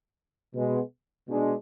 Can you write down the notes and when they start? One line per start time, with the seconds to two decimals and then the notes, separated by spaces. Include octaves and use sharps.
0.54 B2 G#3 B3
1.29 B2 G#3 D4